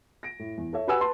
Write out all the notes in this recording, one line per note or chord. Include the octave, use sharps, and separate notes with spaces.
A#6 D7
A2
E2
A4 C#5 E5
F#4 G4 B4 F#5 G#5 E6
B4 A5 C6